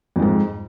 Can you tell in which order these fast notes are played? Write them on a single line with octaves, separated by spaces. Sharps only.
F2 G#3 G#2